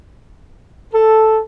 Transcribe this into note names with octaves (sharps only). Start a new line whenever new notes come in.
A4